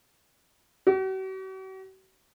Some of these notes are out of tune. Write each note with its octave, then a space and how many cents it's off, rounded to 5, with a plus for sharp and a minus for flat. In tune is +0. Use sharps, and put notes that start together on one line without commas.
F#4 +45